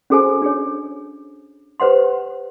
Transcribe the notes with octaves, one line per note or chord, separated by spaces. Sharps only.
C#4 F#4 G#4 A4 C5 G#5
D4 G#4 C#5
G4 B4 C5 F#5 C6